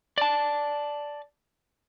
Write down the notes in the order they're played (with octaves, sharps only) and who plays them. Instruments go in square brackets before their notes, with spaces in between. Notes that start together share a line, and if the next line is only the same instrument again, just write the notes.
[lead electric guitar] D5 A5